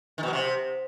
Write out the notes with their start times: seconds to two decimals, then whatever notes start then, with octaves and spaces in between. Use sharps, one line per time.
0.18 D#3
0.23 B2
0.28 F#3
0.33 C3